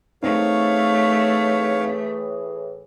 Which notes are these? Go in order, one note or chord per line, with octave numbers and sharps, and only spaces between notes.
A2 E3 A3 C4 D#4 G#4 C#5 F5